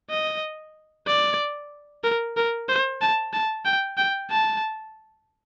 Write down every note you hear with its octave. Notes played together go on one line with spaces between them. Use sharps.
D#5
D5
A#4
A#4
C5
A5
A5
G5
G5
A5